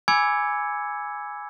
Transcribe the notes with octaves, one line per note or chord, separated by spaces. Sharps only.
G#5 B5 D6 E6 G#6 C#7